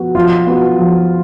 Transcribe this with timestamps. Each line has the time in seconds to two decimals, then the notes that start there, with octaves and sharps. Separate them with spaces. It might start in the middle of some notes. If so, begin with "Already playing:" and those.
Already playing: F3 B3 F#4
0.15 F3 F4
0.47 B3 F#4
0.79 F3